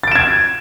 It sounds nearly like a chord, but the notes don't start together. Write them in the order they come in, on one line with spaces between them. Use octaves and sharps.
A6 D7 E7 G#6